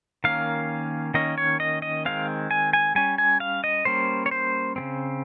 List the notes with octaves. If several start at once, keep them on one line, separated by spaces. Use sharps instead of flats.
D#3 A#3 C#4 F5
D#3 A#3 C#4 D#5
C#5
D#5
D#5
D#3 G#3 C4 F5
G#5
G#5
G3 C#4 G#5
G#5
F5
D#5
G3 A#3 C#4 C5
C#5
C5
C#3 G#3 C4